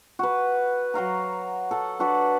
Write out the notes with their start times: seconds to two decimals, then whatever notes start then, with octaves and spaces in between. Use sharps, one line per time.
0.19 F#4 B4
0.94 F#3 F#4 F5 A#5
1.71 A4 F#5 A5
2.00 D4 F#4 B4 D5